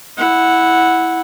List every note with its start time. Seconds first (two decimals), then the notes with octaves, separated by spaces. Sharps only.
0.18 E4 F#5